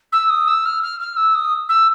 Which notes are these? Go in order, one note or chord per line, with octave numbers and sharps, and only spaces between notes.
E6
D#6
E6
F6
F6
F6
E6
D#6
E6